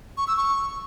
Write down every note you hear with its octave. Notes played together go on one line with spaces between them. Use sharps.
C#6
E6
C#6